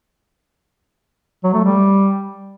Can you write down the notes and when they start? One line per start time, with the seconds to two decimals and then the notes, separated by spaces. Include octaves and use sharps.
1.44 F#3
1.54 A3
1.64 G3